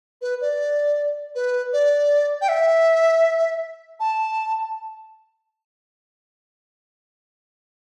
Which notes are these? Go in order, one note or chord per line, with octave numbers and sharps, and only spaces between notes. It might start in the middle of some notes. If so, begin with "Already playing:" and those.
B4
D5
B4
D5
G5
E5
A5